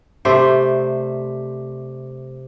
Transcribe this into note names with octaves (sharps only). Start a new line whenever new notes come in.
C3 A3 C5 D5